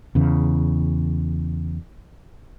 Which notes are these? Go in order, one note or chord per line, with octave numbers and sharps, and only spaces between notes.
E2 C#3